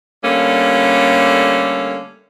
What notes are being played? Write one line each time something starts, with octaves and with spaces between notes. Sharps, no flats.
D3 G3 A3 A#3 C#4